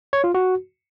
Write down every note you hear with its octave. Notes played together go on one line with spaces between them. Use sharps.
C#5
F4
F#4